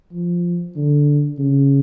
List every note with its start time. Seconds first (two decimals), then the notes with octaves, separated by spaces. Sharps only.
0.13 F3
0.76 D3
1.38 C#3